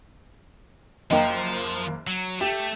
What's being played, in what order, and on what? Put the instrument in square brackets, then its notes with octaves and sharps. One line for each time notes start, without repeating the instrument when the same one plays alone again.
[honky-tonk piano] F#1 A#3 [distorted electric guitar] F3 [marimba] D#5 G5 A#5
[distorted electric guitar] F#3
[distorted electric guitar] A3 [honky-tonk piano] G4